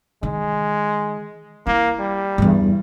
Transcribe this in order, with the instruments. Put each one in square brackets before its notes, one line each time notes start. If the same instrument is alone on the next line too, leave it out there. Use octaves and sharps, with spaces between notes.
[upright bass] D#3 [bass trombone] G#3
[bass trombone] A#3 [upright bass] E4
[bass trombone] G3
[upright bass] E2 G2